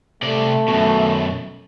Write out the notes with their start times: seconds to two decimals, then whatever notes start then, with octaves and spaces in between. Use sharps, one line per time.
0.22 C3 A3 D5
0.68 F#2 B2